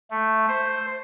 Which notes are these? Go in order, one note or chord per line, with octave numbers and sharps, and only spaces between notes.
A3
C5